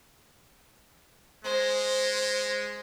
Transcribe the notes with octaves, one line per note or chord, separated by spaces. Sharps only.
G#3 C5